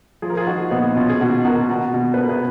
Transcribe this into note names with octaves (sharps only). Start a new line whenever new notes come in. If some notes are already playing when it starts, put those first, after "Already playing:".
F3 G#4
A#4
F4 G#4
F3 D#4 F#4
A#2 B3 D#4
B2 C#4 F4
G#4
B2 D#4 F#4
B2 F#4 A#4
B2 F#4 A#4
B2
B4
B2 A#4
G#4 B4